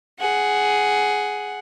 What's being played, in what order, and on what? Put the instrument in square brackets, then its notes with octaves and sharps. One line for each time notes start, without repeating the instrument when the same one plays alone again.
[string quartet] G#4 F#5